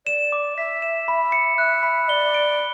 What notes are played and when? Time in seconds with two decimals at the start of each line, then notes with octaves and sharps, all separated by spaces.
0.06 D5 E7
0.32 D6
0.57 E5 B6
0.82 E7
1.08 B5
1.32 C#7
1.58 E5 F#6
1.83 B5
2.09 D5 G7
2.34 D7